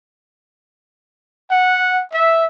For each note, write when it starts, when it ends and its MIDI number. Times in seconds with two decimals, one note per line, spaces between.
1.51 2.02 78
2.13 2.45 76